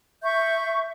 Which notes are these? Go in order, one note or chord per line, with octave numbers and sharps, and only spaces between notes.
E5 C#6 G6